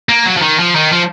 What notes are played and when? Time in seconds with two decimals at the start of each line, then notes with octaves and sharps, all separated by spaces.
0.09 A#3
0.26 F#3
0.37 F3
0.42 D#3
0.59 F3
0.75 D#3
0.92 F3